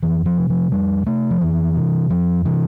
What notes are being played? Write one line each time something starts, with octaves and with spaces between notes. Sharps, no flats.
F2 E3
F3
C3
F3
F2 G3
C3 A3
F3
F2 E3
C3
F2 F3
C3 E3